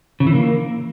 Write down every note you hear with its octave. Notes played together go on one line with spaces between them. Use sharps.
C#3
E3
A#3